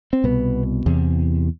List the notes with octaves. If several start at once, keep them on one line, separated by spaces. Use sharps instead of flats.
C4
C2 B2 B3
E2 C3